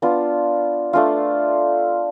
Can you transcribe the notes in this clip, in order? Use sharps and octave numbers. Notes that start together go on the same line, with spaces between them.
B3 D4 F4
A3 D4 F4